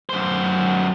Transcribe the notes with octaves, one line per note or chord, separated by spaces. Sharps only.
F#2 C5